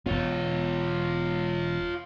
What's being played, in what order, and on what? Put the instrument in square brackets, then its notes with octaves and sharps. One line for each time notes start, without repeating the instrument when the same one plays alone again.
[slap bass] E1 B3 [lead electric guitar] F4 C#5